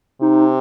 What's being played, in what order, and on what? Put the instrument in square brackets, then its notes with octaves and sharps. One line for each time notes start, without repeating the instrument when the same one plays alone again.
[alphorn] C3 [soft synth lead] D#4